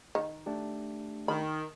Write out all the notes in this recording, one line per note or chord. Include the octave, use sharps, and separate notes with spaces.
D#3
A3 D4 G4
D#3 B5